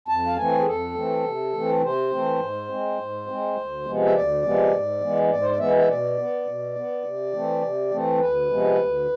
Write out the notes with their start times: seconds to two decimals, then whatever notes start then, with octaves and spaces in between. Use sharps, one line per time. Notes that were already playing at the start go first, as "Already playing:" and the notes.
0.08 F2 A5
0.26 F5
0.37 E3 A3 C4 G#5
0.58 G#4
0.66 F2 A4
0.94 E3 A3 C4
1.24 C3
1.53 E3 A3 C4
1.82 C3 C5
2.11 E3 A3 C4
2.39 G#2
2.69 G#3 C4
2.98 G#2
3.27 G#3 C4
3.57 D2
3.85 C3 F3 G#3 B3
4.05 E5
4.15 D2 D5
4.43 C3 F3 G#3 B3
4.72 G#2
5.01 E3 G#3 B3
5.30 G#2 D5
5.42 C5
5.50 D5
5.59 E3 G#3 B3 E5
5.77 E5
5.87 B2 D5
6.17 B3
6.46 B2
6.75 B3
7.04 C3
7.33 E3 A3 C4
7.62 C3
7.91 E3 A3 C4
8.19 D2 B4
8.49 C3 F3 G#3 B3
8.79 D2